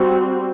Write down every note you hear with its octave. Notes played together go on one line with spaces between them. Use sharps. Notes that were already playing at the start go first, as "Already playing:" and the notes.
Already playing: G3 C4 F#4